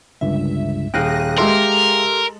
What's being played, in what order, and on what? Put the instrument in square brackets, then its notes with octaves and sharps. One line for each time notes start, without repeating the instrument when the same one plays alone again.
[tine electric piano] G1 C#2 G2 [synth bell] E5
[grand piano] D#1 [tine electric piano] G#4 F5 G5 [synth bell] F#6 A#6 D#7
[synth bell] G#3 A4 [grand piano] G4 E5 C6 [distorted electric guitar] A#4